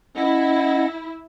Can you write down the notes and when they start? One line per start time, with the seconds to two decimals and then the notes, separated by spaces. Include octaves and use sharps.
0.17 C#4 E4 D#5 F#5